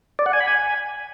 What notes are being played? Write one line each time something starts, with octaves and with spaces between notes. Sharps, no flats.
D5
F#5
G#5
B5
G#5